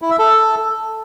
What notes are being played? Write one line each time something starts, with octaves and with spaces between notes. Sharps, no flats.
E4
E5
A4